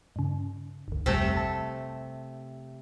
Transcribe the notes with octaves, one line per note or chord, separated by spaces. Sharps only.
G2 C#3
G1 D2
A#1 F2 C3 G3 A3
A5